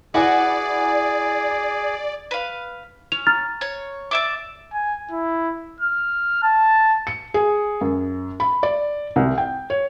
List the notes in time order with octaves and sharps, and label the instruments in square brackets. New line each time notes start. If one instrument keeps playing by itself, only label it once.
[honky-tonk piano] E4 G#5 D6 [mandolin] F#4 B4 F#5 [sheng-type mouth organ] G#4 [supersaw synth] D5
[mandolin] B4 F5
[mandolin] C#4 [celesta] F7
[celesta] A#5 F6 A6
[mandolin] C#5
D5 E5 D6
[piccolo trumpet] G#5
E4
F6
A5
[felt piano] C#7
G#4
F#2
B5
D5
C2
G5
C#5